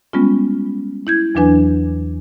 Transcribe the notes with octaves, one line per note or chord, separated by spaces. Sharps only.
G3 G#3 B3 C#4 F4
E4 G6 G#6
E2 E3 F#3 D4 B4 G#5